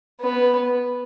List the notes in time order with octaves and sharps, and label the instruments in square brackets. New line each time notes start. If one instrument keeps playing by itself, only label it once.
[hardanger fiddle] B3